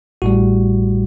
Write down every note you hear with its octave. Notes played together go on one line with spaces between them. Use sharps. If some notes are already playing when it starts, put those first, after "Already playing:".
A1 A2 G3 F#4